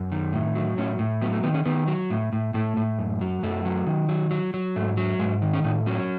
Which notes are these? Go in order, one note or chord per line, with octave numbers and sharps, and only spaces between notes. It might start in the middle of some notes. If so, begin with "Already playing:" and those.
Already playing: F#2
D#3
A2
F#3
A2 C#4
A2
F#3 B3
A3
D#3 B3
C#4
D#3 B3
F#3
A2
A2
A2 A3
A2
F#2
F#3
F#2 A3
F#3
D#3
F#3
F#3
F#3
G#2 A3
F#3
G#2 G#3
D#3
C#4
A2 D#4
F#3 C#4